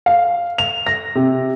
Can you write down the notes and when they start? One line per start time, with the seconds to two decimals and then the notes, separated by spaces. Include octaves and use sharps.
0.06 F5
0.58 F7
0.87 A#6
1.15 C3